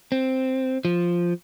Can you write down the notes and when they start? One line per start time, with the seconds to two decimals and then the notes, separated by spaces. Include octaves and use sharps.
0.12 C4
0.85 F3